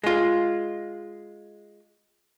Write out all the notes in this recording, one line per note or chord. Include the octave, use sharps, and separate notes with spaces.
G#3 F4